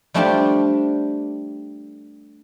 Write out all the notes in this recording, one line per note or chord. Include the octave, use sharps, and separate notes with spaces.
G3 A3 C4 D4 F4 G4